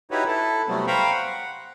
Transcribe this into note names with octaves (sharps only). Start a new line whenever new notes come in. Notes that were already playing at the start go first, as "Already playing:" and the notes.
D#4 E4 F#4 G4 B4 C#5
E4 A4
C3 F#3 G3 A3 B3 C4
C5 F5 G5 A#5 B5 C#6
F#5